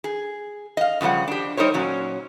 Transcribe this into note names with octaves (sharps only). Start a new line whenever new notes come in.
G#4
D#5 F5
F#2 C#3 F3 G3 F#5
D4 G4
G3 D#4 A#4 C5 C#5
A#2 F#3 C#4